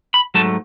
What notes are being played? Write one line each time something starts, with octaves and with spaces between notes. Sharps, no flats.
B5
G#2 F#3 A3 A5